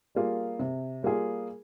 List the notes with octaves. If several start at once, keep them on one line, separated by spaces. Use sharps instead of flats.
G3 A#3 F4 G#4
C3
G3 A#3 F4 G#4